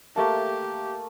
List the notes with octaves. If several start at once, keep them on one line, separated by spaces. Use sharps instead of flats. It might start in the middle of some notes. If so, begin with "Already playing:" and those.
A3 A#3 G4 A5